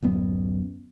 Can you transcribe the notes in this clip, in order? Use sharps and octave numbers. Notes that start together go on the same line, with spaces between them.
D1 F#2 B3